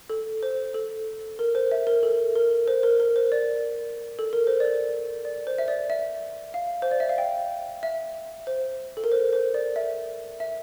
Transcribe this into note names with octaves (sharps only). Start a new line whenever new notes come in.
A4
C5
A4
A#4
C5
E5
A#4
A4
A#4
C5
A#4
A#4
C5
D5
A4
A#4
C5
D5
D5
C5
E5
D5
E5
F5
C5
D5
E5
F5
G5
E5
C5
A4
A#4
C5
C5
D5
E5
E5